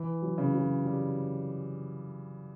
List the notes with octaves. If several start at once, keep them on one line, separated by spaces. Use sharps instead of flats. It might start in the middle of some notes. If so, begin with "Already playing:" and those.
Already playing: E3
F#3
C#3
F#3
G3